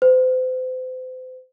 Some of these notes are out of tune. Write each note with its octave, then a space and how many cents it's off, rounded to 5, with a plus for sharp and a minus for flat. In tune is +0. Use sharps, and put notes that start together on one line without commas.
C5 -40